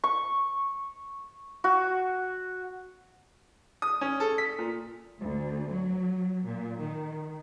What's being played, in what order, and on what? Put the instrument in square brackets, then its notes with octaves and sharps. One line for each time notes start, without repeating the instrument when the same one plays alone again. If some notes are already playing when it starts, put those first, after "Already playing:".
[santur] C#6
F#4
[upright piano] D#6
C#4
A4
B6
A#2
[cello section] D2
F#3
A#2
D#3